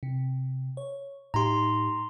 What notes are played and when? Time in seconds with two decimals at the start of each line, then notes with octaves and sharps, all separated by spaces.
0.03 C3
0.77 C#5
1.34 A2 D#4 G4 A#5 C6